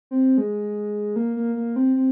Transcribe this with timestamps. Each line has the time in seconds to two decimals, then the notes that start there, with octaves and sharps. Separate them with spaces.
0.11 C4
0.38 G#3
1.16 A#3
1.36 A#3
1.55 A#3
1.76 C4
1.96 C4